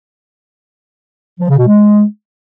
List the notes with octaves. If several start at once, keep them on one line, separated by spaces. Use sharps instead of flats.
F3
C#3
B2
G#3